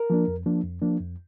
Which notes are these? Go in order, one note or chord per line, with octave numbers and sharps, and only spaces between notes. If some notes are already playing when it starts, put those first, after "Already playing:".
Already playing: A#4
F3 A#3 D4
F2
F3 A#3 D4
F2
F3 A#3 D4
F2